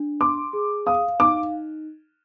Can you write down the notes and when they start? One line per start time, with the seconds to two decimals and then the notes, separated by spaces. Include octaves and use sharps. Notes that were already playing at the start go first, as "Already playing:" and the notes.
Already playing: D4
0.21 C6 D6
0.53 G#4
0.86 F5 D#6
1.20 D#4 D6